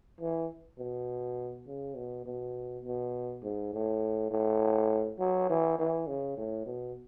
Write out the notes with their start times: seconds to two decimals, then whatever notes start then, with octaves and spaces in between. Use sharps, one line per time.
0.21 E3
0.79 B2
1.67 C#3
1.96 B2
2.26 B2
2.85 B2
3.43 G#2
3.74 A2
4.31 A2
5.19 F#3
5.50 E3
5.79 E3
6.07 C#3
6.37 A2
6.66 B2